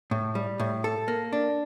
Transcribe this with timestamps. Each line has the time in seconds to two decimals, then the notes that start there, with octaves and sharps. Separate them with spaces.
0.11 A2
0.35 G3
0.59 A2
0.84 A4
1.08 A#3
1.33 D4